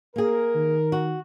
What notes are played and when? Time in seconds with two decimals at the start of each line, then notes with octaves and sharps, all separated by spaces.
0.16 A#3 G#4 A#4
0.55 D#3
0.92 F#4